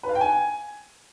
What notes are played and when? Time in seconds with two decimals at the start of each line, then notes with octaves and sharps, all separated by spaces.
0.03 B4
0.09 F5
0.15 G5
0.21 G#5